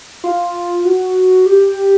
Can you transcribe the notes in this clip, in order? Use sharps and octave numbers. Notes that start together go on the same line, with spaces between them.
F4
F#4
G4